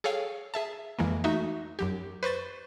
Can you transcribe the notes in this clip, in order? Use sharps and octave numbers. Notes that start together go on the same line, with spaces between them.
G#4 A4 C#5 F5 G5
G#4 E5 A5
F2 E3 G#3 A#3
A3 D#4 F#4 E5
F#2 F#3 G4
B4 C5 C#6 A6